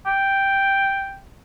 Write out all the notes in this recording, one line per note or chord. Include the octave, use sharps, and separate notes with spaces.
G5